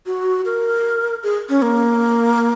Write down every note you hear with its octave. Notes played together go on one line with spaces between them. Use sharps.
F#4
A#4
G#4
C#4
A#3